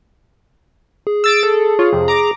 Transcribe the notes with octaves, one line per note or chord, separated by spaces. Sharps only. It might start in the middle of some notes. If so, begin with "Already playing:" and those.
G#4
E6 A6 D7
A4
F4 C#5
F2 C3
A#5 D6